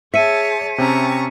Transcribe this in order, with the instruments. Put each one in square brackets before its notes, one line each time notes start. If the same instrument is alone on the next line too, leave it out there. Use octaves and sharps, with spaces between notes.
[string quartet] G#4 C#5 A5 [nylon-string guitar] E5 [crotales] B6 C#7 D#7
[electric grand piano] C3 C4 C#4 [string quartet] A5 A#5 C#6